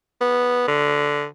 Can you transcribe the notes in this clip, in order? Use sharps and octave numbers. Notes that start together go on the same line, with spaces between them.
B3
D3